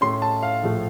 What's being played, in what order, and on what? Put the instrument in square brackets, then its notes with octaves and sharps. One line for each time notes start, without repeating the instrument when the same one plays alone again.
[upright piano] A2 A3 C#4 C6
A5
F5
A#1 A2 F3 A3